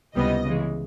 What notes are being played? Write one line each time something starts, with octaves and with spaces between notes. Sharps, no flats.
C#2 C3 E3 G3 B3 D#5
C#3 E3 G#3